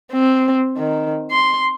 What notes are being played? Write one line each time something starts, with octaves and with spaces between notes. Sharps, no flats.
C4
D#3
C6